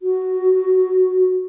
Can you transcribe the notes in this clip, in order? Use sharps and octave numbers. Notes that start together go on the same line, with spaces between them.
F#4